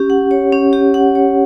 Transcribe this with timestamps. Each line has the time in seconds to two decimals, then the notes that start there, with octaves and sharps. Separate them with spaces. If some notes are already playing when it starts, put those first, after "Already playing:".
Already playing: C#4 G4
0.10 F#5
0.31 C#5
0.52 C#4
0.73 G4
0.94 F#5
1.15 C#5